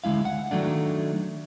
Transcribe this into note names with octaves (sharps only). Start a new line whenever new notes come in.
D2 G2 G#3 E4 F5
F#5
D#3 F#3 A3 D4